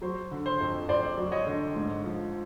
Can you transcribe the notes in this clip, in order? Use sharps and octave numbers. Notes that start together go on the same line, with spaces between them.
F#3 C5
D3
C5
F2
F2 C5 D5
F#3
C#5 D#5
D3
G#2
F3